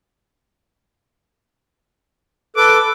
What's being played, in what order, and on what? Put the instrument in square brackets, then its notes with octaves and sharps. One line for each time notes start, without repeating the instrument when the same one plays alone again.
[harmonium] A4 B4 [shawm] D6